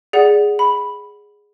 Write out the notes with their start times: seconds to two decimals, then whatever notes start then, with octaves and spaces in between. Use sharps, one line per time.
0.13 G#4 D5 F#5
0.59 B5